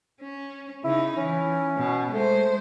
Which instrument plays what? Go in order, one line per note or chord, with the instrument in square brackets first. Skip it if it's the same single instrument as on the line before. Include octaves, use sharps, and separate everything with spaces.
[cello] C#4
[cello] C#3 D#4 [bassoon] E4
[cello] E3 [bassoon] C#4
[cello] B2
[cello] G#3 C5 [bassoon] A3